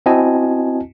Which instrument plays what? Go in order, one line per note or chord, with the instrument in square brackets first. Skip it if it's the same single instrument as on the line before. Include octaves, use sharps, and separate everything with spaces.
[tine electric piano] C4 E4 F#4 D#5 G#5 A5